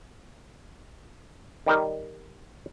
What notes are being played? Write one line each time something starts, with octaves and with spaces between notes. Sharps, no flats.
D#3 G3 D#4 A#4